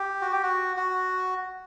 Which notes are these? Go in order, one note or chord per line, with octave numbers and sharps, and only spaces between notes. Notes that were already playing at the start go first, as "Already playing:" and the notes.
Already playing: G4
F#4
G4
F#4
F#4